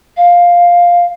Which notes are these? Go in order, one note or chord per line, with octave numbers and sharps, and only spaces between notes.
F5